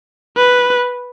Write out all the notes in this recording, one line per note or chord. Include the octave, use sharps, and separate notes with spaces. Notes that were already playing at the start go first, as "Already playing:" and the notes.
B4